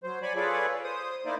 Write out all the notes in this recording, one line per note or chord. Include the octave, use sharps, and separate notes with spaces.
F#3 C5
C#5 D5 G#5 B5
F4 G#4 A4 B4 C#5 D5
C5 D#6
A#3 D#4 E4 C5 D5